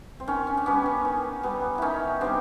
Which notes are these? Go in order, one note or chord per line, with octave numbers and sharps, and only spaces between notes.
C4
D#3 C#4
C#4
D4
G3 B3 C#4
C#4
D#3
G3 B3
D#3 C#4 D#4 E4
G3 B3 C4 D4